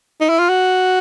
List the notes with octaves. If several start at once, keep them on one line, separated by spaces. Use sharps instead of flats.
D#4
E4
F4
F#4